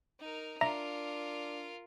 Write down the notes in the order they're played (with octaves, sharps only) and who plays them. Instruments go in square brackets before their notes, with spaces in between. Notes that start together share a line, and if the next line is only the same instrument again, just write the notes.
[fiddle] D#4 A#4
[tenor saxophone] D4 [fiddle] F4 A#4 [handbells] E5 A#5 A#6